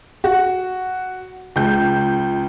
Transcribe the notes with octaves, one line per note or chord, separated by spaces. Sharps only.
F#4
C#2 G6